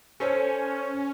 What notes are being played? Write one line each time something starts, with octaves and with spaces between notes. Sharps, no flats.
C#4 A4 C5 C#5